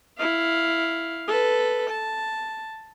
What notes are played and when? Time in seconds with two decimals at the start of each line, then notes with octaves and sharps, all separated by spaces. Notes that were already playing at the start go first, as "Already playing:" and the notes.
0.18 E4 F5
1.28 A4 B4
1.90 A5